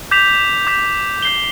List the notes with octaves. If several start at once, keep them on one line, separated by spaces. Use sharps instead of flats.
D6 G6 B6 F7
D6 G6 B6 F7
G6 C7 G7